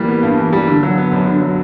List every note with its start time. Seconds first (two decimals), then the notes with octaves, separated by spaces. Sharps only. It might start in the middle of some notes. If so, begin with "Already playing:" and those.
Already playing: E3 G3 A#3
0.08 B3
0.23 G2
0.37 E3
0.53 G3
0.67 D3
0.83 F#3
0.98 B3
1.12 F#2
1.27 D3
1.42 F#3